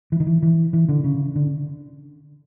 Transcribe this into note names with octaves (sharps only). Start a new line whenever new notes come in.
E3
D#3
E3
E3
E3
D3
C#3
D3